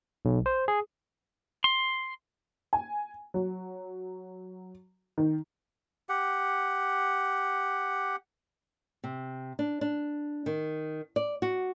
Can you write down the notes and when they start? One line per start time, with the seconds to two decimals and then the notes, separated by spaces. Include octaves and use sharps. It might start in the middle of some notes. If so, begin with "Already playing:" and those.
0.25 B1
0.46 C5
0.68 G#4
1.64 C6
2.73 G#5
3.34 F#3
5.18 D#3
6.09 G4 F#5
9.04 C3
9.59 D4
9.81 D4
10.46 D#3
11.16 D5
11.42 F#4